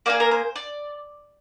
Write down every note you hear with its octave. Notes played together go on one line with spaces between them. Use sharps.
A#3 F4 G#4 D5
A#4
C5
D5